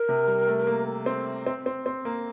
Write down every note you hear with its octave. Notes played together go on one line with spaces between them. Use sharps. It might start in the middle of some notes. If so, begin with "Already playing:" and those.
Already playing: A#4
C3
G3
A3
A#3
C4
C4
C4
C4
A#3